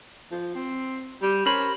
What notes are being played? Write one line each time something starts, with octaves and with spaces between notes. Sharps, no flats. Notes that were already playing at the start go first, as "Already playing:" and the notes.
F3
C4
G3
C#4 A#4 C5 B5